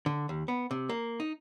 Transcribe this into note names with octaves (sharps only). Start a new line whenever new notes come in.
D3
D#2
B3
C3
A#3
D#4